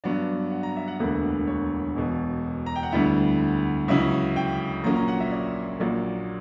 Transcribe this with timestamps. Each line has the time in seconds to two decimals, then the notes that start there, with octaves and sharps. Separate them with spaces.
0.04 G2 F#3 B3 D4 D5
0.51 F#5
0.63 A#5
0.76 E5
0.88 F#5
1.00 E1 D2 D3 A#3 B4
1.47 C#5
1.95 E1 E2 B2
2.66 A#5
2.76 G5
2.83 F#5
2.92 D2 D3 G3 B3 E4 E5
3.88 C#2 C#3 F#3 C#4 E4 E5
4.36 G5
4.84 A#1 A#2 F#3 A#3 C#4 A#5
4.96 A#5
5.08 F#5
5.20 E5
5.31 D5
5.80 A#1 A#2 F#3 A#3 D5